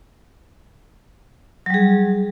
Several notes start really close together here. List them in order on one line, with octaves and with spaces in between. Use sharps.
F#3 G3 G#4